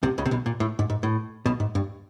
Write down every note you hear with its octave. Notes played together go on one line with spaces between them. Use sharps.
C2 C3
C#2 C#3
C3
B1 B2
A#2
A2
G#2
G#2
A2
B1 B2
G#2
G2